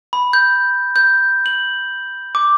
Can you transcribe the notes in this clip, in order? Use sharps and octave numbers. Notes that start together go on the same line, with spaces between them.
B5
G6
G6
F#7
D6